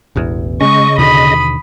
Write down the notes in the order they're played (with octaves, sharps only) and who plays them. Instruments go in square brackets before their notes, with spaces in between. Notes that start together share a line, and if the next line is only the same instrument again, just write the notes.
[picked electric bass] E1 A1 E2
[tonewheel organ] C#3 D#5 [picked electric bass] G#3 B3 C#4 [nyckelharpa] C#6
[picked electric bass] D#2 B2 D3 [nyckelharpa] B5 D#6